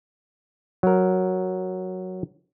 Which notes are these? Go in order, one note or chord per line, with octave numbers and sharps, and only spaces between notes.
F#3 A#4